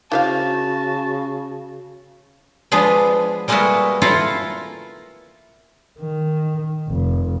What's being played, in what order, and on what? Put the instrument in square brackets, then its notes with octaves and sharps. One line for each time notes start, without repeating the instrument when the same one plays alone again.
[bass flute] C#3 [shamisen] E4 C5 F5 [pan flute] F#4 [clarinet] A5
[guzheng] F3 G#3 B3 D4 G#4 B4
G3 G#3 A#3 B3 E4 F#4
E4 F4 A4 A#4 F5 F#5
[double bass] D#3
F1